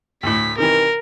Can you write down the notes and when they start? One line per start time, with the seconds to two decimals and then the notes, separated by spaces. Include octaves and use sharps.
0.23 D2 A2 B6
0.58 C3 D#3 E3 A#4